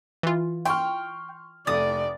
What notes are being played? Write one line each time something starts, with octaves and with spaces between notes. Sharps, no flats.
E3 F4
G5 C6 C#6 F6
F1 A3 D5 D#6 A6